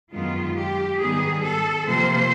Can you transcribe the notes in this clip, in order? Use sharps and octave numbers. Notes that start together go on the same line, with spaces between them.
F#2 D#3 G#3 B3 F4
G4
G#2 D#3 G3 B3 G#4
A4
C3 F3 A#3 C5